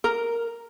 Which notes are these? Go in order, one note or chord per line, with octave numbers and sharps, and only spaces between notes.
A#4